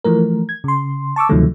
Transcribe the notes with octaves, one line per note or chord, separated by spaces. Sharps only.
E3 F3 A3 A#4
G#6
C#3 C6
A5 C#6 D6 E6
D2 C3 D#3 F3 F#3 A3